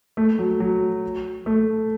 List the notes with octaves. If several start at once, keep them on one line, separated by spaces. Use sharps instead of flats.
A3
F#3
F#3
A3